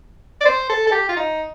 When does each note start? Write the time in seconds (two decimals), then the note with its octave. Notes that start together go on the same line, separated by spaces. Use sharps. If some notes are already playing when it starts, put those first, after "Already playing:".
0.41 D5
0.45 C5
0.69 A4
0.87 A4
0.92 G4
1.09 F4
1.16 D#4